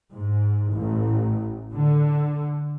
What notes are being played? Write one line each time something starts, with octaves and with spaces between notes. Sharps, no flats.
G#2
A1
D3